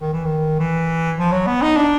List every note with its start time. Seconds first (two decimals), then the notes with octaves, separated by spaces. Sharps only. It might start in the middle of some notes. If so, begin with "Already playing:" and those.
0.01 D#3
0.13 E3
0.25 D#3
0.60 E3
1.18 F3
1.32 F#3
1.47 B3
1.62 D#4
1.76 D4